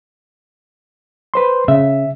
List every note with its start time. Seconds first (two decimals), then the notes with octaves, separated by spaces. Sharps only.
1.34 B4 C5 C6
1.68 C#3 E5